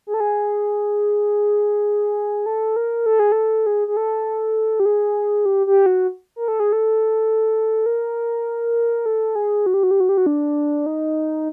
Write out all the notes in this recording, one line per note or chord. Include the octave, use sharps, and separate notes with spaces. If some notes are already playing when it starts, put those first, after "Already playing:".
G#4
A4
G#4
A4
A#4
A4
G#4
A4
G#4
G#4
A4
G4
G#4
G4
G4
F#4
A#4
A4
G#4
A4
A#4
A4
G#4
F#4
G4
F#4
G4
F#4
G4
F#4
D4
D#4